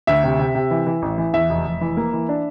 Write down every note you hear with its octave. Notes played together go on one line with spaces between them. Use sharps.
D2 E5
C3
C3
C3
E3
E3
A1
E3
E2 E5
F1
F1
E3
A#3
E3
D4